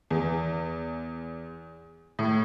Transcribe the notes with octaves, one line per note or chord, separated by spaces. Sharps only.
E2
A2